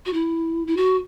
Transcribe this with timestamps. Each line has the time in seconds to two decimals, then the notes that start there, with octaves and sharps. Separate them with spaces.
0.06 F#4
0.13 E4
0.67 E4
0.77 F#4